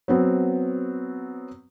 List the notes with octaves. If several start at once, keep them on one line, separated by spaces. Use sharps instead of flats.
F#3 B3 C4